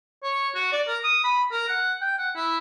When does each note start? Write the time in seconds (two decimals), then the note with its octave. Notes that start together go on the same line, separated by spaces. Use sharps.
0.23 C#5
0.55 F#4
0.72 D5
0.87 A#4
1.04 D#6
1.24 B5
1.51 A#4
1.68 F#5
2.01 G5
2.18 F#5
2.36 E4